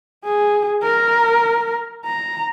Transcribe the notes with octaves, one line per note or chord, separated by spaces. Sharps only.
G#4
A#4
A#5